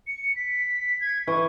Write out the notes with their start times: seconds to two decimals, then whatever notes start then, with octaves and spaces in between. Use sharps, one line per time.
0.07 C#7
0.36 B6
1.01 G#6
1.28 E3 C#6